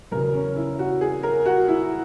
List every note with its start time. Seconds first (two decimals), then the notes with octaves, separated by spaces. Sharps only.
0.11 E2 C#3 F#3 A#4
0.34 C#4
0.56 E4
0.79 F#4
1.01 G#4
1.23 A#4
1.46 F#4
1.68 E4